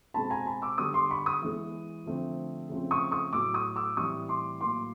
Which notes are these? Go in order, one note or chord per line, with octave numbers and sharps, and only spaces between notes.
B2 G#3 C4 A5 B5
G#5 A#5
A5 B5
D6 E6
D3 G3 B3 C#6 D#6
C6 D6
B5 C#6
C#6 D#6
E3 G#3 B3
D3 F3 A3 C4
C#3 F3 A3 C4
C#6 D#6
C#6 D#6
A2 F#3 B3 D6 E6
C#6 D#6
D6 E6
A2 E3 G3 C4 C#6 D#6
C6 D6
A2 F#3 A#3 C6 D6